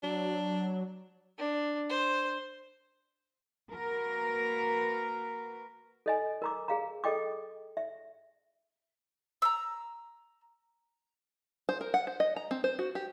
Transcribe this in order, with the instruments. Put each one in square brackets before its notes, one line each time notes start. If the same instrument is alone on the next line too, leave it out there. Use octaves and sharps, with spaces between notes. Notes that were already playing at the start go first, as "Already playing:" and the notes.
[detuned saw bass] F#3 [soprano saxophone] D4
[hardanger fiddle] D4
C5
[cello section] A#3 F#4 A#4 B4
[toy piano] A4 D#5 G#5
A#4 A#5 D6
G#4 F5 A#5
G#4 A4 D#5 G5 D6
E5
[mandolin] A#5 E6
[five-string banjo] C5
A#4
F#5
C5
D#5
A#5
C4
C5
F#4
G4